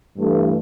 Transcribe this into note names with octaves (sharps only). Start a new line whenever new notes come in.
G2 E3 A3